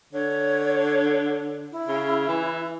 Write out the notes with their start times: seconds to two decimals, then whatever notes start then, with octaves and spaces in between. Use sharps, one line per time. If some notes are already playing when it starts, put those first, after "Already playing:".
0.13 D3 C#5
1.72 E4
1.88 C#3
2.28 E3